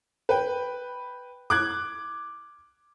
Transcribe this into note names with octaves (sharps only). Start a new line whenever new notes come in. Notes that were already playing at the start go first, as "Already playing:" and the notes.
B4 G5
D6 F#6 G#6